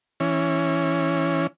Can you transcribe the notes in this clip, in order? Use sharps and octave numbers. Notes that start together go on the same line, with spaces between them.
E3 C#4